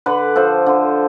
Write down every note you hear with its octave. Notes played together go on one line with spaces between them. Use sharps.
D3 B4 D5
F3 A4 C5
D3